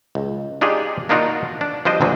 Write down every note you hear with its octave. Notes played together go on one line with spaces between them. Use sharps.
C#2
D4 D#4 F4 G4 G#4 D5
A#3 D4 D#4 F4 F#4 A#4
D4
F3 G3 D4 C5 D#5
D2 A#2 D3 F3 F#3